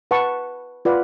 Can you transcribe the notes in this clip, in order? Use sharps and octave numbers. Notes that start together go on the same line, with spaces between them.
B4 F#5 A5 C#6
F4 B4 D5 F#5